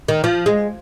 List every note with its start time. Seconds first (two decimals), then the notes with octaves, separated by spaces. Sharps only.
0.08 D#3
0.24 F3
0.46 G#3